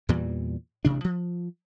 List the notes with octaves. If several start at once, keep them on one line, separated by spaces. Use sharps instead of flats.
E2 A#2 E3 G3
A1 C3 D4
F3